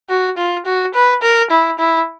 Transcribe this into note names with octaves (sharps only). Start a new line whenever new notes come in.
F#4
F4
F#4
B4
A#4
E4
E4